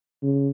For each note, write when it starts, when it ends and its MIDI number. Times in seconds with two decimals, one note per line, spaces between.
0.23 0.49 49